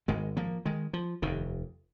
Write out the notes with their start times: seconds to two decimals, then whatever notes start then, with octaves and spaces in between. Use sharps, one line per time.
0.08 G#1 G#2 D#3 G#3
0.37 F3 A#3
0.66 D#3 G#3
0.93 F3
1.22 F1 D#2 D#3